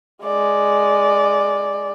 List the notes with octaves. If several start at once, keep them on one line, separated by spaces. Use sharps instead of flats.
G#3 D5